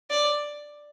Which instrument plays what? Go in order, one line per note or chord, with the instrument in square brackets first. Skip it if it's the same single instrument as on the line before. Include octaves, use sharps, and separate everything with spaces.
[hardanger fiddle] D5